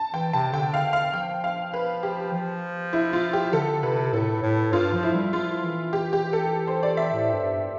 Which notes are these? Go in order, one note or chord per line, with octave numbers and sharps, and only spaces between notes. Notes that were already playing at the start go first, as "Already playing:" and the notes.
Already playing: A5
E3 G5
C3 A5
D3 G5
F5
F5
F3 G5
F5
B4
G4
F3
E4
F4
G4
D3 A4
C3 B4
A2 A4
A2
G2 F4
F3
E4
G3
F3 F4
E3
G4
G4
A4
C5
D5
E5
A2
G2
G2